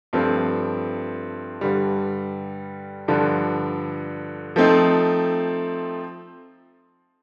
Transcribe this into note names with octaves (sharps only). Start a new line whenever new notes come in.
G2 F3 A3 C4
G2 D3 G3
G2 D3 F3
F3 A3 C4 D#4